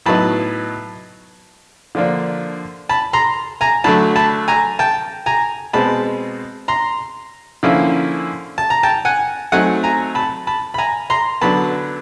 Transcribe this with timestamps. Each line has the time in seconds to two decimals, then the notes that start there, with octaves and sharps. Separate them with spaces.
0.06 A2 F#3 B3 D#4 A5 B5
1.95 D3 F3 A#3 D4
2.89 A5 B5
3.13 A#5 C6
3.61 G#5 A#5
3.84 D3 F#3 A3 A5 B5
4.16 A5 B5
4.48 G#5 A#5
4.79 G5 A5
5.26 G#5 A#5
5.73 B2 G#3 C4 A5 B5
6.68 A#5 C6
7.63 D3 F3 A#3 C#4 E4
8.58 A5
8.70 A#5
8.83 G5 A5
9.05 F#5 G#5
9.52 F#3 A3 C4 D#4 F#5 G#5
9.84 G#5 A#5
10.15 A5 B5
10.47 A5 B5
10.74 B5
10.78 G#5 A#5
11.10 A#5 C6
11.41 D3 F#3 B3 A5 B5